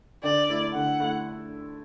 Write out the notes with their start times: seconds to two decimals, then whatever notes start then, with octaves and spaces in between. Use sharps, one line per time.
0.23 D3 D5
0.49 A3 E4
0.74 D3 F#5
1.00 A3 E4